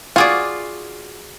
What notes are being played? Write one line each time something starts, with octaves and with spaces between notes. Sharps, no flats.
F4 F#4 G#4 D5